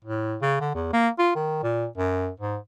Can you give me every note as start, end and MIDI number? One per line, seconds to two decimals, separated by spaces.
0.05 0.36 45
0.42 0.57 49
0.60 0.72 50
0.75 0.91 40
0.93 1.08 58
1.19 1.31 65
1.35 1.61 51
1.63 1.87 46
1.98 2.29 42
2.40 2.57 44